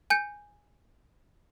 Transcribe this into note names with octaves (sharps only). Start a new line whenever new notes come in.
G#5 G6 C#7